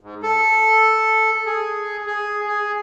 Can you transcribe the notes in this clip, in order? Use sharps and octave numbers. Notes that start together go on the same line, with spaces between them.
G#2
A4
G#4
G#4
G#4